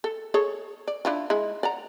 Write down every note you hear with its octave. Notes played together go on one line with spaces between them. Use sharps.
A4
G#4 A4 C#5
D5
D4 E4 F4
G#3 E4
D5 F#5 A#5